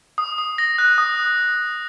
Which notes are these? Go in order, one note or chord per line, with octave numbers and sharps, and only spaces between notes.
D#6
D#6
A#6
F#6
D#6